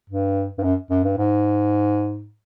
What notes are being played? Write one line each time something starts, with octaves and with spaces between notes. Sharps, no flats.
G2
G2
F#2
F#2
G2
G#2